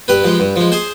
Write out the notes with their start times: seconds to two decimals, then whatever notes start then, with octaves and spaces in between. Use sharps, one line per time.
0.08 G2 G4 B4
0.24 F3 G#3
0.40 G2
0.56 F3 G#3
0.72 G#4 C5